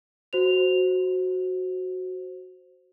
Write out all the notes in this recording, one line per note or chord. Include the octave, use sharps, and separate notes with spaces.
F#4 C5 F7